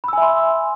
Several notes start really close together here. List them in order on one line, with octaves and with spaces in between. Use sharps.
B5 E6 G#5 E5 C6